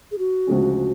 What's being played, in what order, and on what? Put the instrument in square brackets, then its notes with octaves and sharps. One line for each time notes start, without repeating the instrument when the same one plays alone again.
[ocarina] G#4
F#4
[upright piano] D2 C#3 F3 G#3 C#4